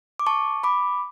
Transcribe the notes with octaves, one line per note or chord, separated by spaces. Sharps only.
D6
A5 C#6
B5 D6